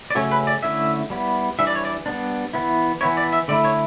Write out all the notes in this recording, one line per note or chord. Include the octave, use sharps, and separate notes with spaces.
D5
C#3 F#3 A3 C#4 C#5
B4
D5
D3 A3 C#4 E4 E5
G3 B3 E4
E3 G3 D4 E5
D5
C#5
D5
G3 B3 D4
E3 B3 E4
E3 B3 E4 C#5
D5
E5
D3 A3 E4 D5
C#5